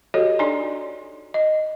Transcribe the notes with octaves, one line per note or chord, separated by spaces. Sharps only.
F#4 G4 A4 C#5 D#5
D4 D#4 D5 G#5 A#5 C6
D#5